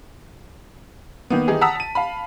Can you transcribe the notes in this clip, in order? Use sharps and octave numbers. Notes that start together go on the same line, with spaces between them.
D#3 A#3 B3
D#3 E3 D#4 G4 G#4
F#5 A5 A#5 D#6 E6 B6
A5 D#7
F5 A5 B5